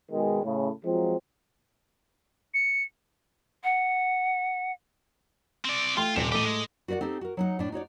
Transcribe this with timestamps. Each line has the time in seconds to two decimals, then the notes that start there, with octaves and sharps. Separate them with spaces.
0.11 B2 D#3 G#3
0.43 A2 C#3
0.85 F3 F#3 G#3 C4 F4
2.54 C#7
3.64 F#5
5.65 C4 D5
5.97 A3 F4 G5 C6
6.16 D#1 C3 E7
6.32 A2 G4 A4 D#5 D6
6.44 G#3
6.88 F#4 A#4 B4 D5 F#5
7.01 C4 D#4 G4 A4
7.21 F#4 A#4
7.37 F#3 D#4 F#5
7.59 A2 D4
7.72 D#4 F#4 C#5 D5